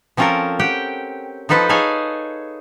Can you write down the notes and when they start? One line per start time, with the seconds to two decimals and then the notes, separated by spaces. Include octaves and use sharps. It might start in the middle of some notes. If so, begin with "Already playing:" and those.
0.17 F3 C4 C#4 F4 A4 A#4
0.59 G4 F#5 G5
1.49 F3 D#4 A4 B4 C5 A5
1.69 D#4 G#4 A4 C#5 F5 G#5